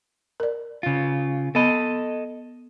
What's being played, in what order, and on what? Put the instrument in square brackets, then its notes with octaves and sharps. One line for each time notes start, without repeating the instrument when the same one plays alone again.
[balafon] A#4 D5
[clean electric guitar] C#3 F4
[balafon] B3 B5 [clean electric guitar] A4 D#5